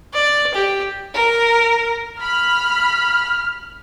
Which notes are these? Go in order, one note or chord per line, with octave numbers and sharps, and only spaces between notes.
D5
G4
A#4
B5 F6